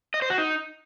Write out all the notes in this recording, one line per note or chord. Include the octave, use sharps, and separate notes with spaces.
D#5
C5
F#4
D#4